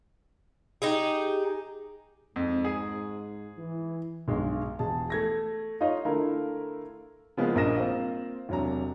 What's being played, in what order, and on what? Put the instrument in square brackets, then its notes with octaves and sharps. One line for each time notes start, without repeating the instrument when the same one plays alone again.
[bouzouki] D#4 G4 G#4
[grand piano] F2 [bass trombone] G#2
[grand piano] G#4
[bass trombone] E3
[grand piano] B1 G2 G#3
E1 G#4 A5
A3 G#6 A#6
D#4 F4 C#5 D#5 F5
D3 A3 E4 F4 A#4
[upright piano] C#3 F3 G#3 A#3 B3 G#4
A#1 G2 A#4 D#5 A#6 E7
A#3 C4 F4
E1 C3 F#3 D4 A#5